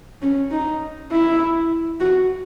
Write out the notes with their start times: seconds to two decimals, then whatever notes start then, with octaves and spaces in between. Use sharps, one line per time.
0.22 C#4
0.51 D#4
1.11 E4
2.00 F#4